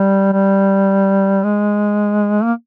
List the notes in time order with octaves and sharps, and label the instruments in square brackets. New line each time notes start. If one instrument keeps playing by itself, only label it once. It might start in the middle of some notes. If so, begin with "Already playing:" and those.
Already playing: [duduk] G3
G3
G#3
A#3